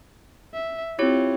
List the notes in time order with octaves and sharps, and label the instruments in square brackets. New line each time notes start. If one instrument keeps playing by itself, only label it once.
[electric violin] E5
[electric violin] C4 F4 [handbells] E4 G4 C#5